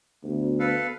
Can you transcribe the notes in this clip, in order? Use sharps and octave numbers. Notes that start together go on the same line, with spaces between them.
D2 B3
A4 B4 F5